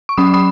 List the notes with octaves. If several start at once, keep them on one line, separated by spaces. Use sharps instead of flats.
C#6
F#3 C#4 B5 D#6
B5 D#6